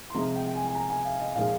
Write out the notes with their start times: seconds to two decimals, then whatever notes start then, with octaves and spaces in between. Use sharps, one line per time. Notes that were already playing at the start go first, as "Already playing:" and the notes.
0.10 C6
0.14 C3 F3 G#3 A#5
0.36 G5
0.46 G5
0.55 G#5
0.67 G#5
0.75 A#5
0.90 G#5
1.05 F5
1.20 D#5
1.35 A#2 F3 G#3 F5